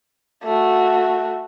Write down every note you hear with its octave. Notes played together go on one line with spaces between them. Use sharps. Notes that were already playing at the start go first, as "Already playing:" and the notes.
A3 F#4